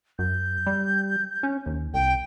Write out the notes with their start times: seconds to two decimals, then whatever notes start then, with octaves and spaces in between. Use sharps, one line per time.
0.19 F#2 G6
0.67 G3
1.43 C#4
1.66 D#2
1.94 C2 G5